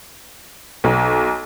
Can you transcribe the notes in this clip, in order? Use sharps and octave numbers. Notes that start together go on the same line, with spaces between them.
B1